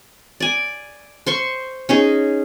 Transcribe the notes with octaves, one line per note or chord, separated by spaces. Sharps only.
D5 G#5
C5 C6 C#6
C#4 D#4 G#4